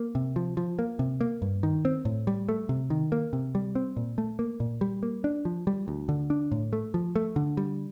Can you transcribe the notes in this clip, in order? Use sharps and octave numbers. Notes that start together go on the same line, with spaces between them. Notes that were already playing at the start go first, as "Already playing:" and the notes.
Already playing: A#3
C3
F3
F3
A#3
C3
A#3
G2
D#3
C4
A2
G3
A3
C3
D#3
A#3
C3
G3
C4
A#2
A3
A#3
A#2
G3
A#3
D4
F3
G3
D2
D3
D4
A2
A3
F3
A3
D3
G3